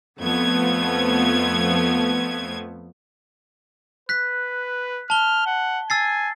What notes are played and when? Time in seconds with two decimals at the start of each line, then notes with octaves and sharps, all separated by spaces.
0.20 F2 F3 A3 B3 G#6
4.09 B4 F#6 B6
5.10 A5 F6 G7
5.46 F#5
5.90 G#5 E6 A6 C7